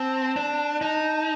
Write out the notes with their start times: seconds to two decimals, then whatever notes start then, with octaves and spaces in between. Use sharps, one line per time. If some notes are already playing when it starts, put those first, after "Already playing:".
Already playing: C4 A5
0.36 D4
0.81 D#4